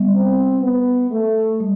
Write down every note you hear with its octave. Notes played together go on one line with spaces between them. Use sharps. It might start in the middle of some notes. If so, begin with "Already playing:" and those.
Already playing: G3 B3
C4
B3
A3
G3